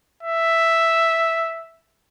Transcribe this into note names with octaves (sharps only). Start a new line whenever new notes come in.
E5